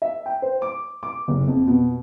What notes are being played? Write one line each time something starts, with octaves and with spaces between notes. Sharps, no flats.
E5
G5
C5
D6
D6
F#1
F2
B2